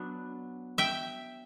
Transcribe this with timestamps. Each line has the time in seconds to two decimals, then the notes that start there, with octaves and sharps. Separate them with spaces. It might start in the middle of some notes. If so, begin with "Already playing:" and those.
Already playing: F#3 B3 D4
0.78 E5 G5